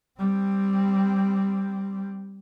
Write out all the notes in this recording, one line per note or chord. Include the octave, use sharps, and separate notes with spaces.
G3 C4